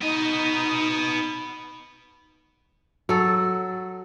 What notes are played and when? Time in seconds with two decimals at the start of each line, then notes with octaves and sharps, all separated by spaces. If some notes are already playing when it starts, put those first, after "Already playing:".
0.01 B3 D#4 D#5
3.09 F#3 A4